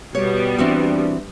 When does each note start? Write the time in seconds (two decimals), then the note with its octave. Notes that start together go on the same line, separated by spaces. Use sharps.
0.15 B2 G3 B3 C#5
0.58 E3 C4 D4 F#4